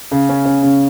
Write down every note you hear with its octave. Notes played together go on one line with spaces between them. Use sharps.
C#3
C#4
C#4
C#3